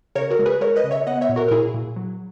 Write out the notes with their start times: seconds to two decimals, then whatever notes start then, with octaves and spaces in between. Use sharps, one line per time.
0.15 C#3 A#4 C#5
0.31 F#4 A#4
0.39 G#3
0.46 G#4 B4
0.61 G#3 A#4 C#5
0.76 B4 D#5
0.84 C#3
0.91 C#5 E5
1.07 B3 D#5 F#5
1.21 C#5 E5
1.29 A#2
1.36 F#4 A#4
1.48 A#4
1.51 A#2 E4 G#4
1.74 A#2
1.96 F#3